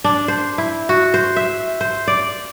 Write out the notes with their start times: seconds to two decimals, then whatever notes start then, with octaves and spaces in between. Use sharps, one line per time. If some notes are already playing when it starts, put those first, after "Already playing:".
0.04 D4
0.28 C5
0.58 E4
0.89 F#4
1.14 C5
1.37 E5
1.81 C5
2.08 D5